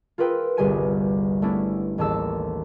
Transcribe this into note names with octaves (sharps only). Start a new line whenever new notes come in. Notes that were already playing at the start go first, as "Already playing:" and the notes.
F4 G#4 A#4 B4 G5 E6
G1 C2 G4 G#4 G#5 D#7
A3 B3 C#4 D4 E4
A1 D#2 G#4 A5 E6